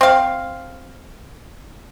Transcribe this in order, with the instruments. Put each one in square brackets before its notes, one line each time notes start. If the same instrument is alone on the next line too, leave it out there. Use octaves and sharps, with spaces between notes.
[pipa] C4 F5